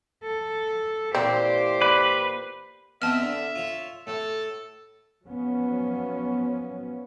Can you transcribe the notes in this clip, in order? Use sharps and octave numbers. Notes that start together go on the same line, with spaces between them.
A4
A#2 E3 A#3 C4 G4 C5
B4 D5
B3 C4 D#4 E5 A5 F6
D3
F4 C#5
A2 A4
F3 F#3 B3 C#4